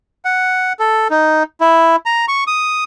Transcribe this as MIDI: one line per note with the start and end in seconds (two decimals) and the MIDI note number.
0.25 0.73 78
0.79 1.08 69
1.10 1.43 63
1.61 1.96 64
2.06 2.25 82
2.28 2.44 85
2.47 2.84 87